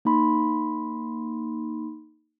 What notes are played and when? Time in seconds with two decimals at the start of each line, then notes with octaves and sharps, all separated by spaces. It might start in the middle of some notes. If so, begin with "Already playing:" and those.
0.05 A#3 D#4 B5 C6